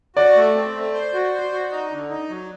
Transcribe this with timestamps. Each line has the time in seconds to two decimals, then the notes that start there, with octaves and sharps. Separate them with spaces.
0.16 F#4 D5
0.36 A3
0.55 C4
0.75 A3
0.93 C5
1.14 F#4
1.33 C5
1.52 F#4
1.71 D#4
1.91 D3
2.10 D#4
2.29 F#3